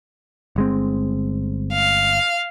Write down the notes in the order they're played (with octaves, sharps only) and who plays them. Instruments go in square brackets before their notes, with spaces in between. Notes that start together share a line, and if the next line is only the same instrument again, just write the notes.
[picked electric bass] G1 G#3 C4
[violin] F5